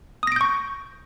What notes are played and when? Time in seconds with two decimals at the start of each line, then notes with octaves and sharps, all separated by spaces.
0.23 D#6
0.27 A#6
0.32 D7
0.36 G6
0.41 C#6